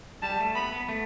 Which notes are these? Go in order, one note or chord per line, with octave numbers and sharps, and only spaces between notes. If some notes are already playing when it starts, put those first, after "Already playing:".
G3 A5
A3
B3 B5
B3
A3